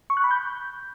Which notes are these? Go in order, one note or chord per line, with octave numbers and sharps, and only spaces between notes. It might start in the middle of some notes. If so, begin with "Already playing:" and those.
C#6
F#6
B5
G6